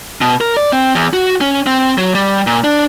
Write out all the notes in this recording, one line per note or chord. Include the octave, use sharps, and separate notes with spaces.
B2
A#4
D5
C4
E2
F#4
C#4
C4
F#3
G3
A#2
D4